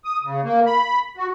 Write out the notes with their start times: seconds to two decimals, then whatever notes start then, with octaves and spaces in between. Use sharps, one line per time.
0.05 D#6
0.23 C#3
0.43 A#3
0.66 B5
1.17 F#4